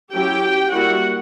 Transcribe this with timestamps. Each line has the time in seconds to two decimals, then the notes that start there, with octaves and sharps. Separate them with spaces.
0.14 F#3 C#4 E4 G4 G5
0.72 G3 A#3 E4 F#4 F#5